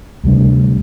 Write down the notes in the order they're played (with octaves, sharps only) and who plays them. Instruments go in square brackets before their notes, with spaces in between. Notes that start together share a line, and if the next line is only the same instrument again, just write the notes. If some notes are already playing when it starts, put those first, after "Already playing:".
[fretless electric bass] D2 C3 G3 D4